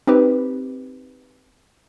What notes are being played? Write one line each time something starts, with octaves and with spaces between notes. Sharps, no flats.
C4 D#4 G4 B4